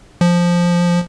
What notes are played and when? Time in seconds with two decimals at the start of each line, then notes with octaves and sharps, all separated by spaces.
0.21 F3